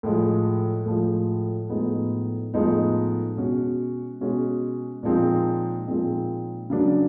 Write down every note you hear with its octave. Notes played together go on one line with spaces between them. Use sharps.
A2 F3 G#3
A2 F3 G#3
A2 F3 G#3 B3 D#4
A2 F3 G#3 B3 D#4
B2 G#3 C#4 F#4
B2 G#3 C#4 F#4
A#2 F3 G#3 C4 D#4
A#2 F3 G#3 C4 D#4
C#3 F#3 A#3 D4